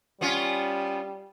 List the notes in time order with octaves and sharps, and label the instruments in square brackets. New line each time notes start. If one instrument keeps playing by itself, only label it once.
[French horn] G3 [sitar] B3 C#4 F4